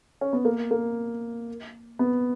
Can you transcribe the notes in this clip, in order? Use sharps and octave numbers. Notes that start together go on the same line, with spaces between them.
C#4
B3
A#3
A#3
B3